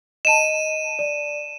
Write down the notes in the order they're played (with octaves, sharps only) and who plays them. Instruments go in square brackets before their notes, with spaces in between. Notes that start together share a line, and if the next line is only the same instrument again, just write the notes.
[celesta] D#5 A5 [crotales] D#7 E7
[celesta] D5